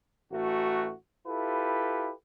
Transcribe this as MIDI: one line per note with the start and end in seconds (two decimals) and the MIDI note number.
0.32 0.93 33
0.32 0.93 57
0.32 0.93 66
1.27 2.11 64
1.27 2.11 65
1.27 2.11 67
1.27 2.11 69
1.27 2.11 71